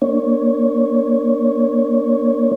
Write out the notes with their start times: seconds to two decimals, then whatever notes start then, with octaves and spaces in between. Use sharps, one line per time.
0.02 A#3 D4 C#5